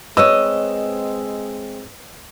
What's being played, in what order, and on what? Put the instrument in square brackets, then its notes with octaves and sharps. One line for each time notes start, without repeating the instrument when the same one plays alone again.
[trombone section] G#3 C4 [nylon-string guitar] B4 C#5 [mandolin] D#5 [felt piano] E6